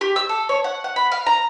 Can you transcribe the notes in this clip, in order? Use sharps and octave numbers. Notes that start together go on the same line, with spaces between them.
G4
E6
A4
C#5
F#5
F#5
B5
F5
A#5